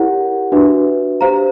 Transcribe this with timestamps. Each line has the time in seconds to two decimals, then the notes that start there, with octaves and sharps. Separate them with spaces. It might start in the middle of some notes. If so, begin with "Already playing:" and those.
Already playing: E4 G4 A#4 C#5 F#5
0.52 D4 F#4 B4 E5
1.21 G4 C5 F5 A#5